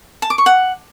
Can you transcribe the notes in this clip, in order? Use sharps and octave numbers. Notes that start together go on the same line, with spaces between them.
A5
D6
C#6
F#5